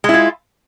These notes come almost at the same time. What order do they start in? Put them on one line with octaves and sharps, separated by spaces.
G#3 E4 F4